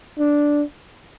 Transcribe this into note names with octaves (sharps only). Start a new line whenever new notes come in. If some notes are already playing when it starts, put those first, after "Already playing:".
D4